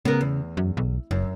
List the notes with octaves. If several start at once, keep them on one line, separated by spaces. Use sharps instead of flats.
C#3 B3 A#4
E2
F#2
B1
F#1 F#2